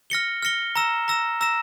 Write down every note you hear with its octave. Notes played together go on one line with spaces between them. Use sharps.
F6 A#6 C#7 G7
F6 A#6 C#7 G7
A#5 E6 A#6 E7
A#5 E6 A#6 E7
A#5 E6 A#6 E7